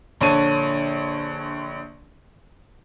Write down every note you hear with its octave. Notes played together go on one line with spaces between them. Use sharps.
A#1 D3 C#5 A5 D#7